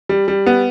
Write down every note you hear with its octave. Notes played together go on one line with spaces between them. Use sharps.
G3
G3
B3